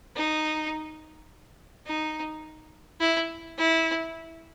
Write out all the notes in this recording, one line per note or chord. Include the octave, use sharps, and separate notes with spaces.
D#4
D#4
E4
E4